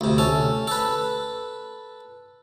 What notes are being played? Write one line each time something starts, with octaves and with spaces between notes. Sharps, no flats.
D2 C3
C#4 A4
A4 B4